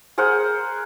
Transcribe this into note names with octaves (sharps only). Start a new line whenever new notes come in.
G#4 A#4 C5 F#5